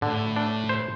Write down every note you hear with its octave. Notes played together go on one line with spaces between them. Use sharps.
A2 D3
D4
C5